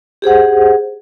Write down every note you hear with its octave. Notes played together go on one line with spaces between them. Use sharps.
G4 G#4 C5 F#5